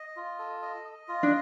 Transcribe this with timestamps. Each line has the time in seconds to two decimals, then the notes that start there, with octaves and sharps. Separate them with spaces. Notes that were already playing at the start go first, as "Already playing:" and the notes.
Already playing: D#5
0.16 F4
0.39 A4
0.62 D#5
0.85 D#5
1.08 F4
1.23 D4